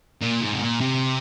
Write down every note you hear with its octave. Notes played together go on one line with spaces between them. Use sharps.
A#2
G#2
C3
A#2
C3